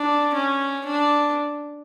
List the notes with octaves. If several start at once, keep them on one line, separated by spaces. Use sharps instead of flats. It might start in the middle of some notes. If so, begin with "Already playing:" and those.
Already playing: D4
C#4
D4